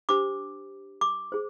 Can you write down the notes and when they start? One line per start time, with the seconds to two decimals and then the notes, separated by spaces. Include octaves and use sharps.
0.09 D4 G4 C5 D6
1.01 D6
1.32 G#4 C5